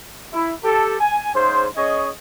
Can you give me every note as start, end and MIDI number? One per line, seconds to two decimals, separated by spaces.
0.33 0.53 64
0.64 0.95 67
0.64 0.95 69
1.00 1.34 80
1.35 1.66 44
1.35 1.66 49
1.35 1.66 72
1.77 2.09 61
1.77 2.09 68
1.77 2.09 73
1.77 2.09 75